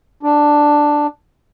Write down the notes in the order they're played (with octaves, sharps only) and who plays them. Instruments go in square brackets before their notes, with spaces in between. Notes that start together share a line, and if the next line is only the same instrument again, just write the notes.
[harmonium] D4